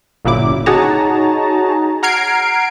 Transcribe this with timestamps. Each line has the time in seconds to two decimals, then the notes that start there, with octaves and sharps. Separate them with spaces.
0.25 G1 A#2 C#3 F#3 E4 D6
0.66 D#4 F#4 G#4 C#5 A5 A#5
2.03 F#5 A#5 F6 G#6 C7 D7